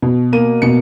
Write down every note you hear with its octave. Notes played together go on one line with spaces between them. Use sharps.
B2
A#3 D#7
B2 C#7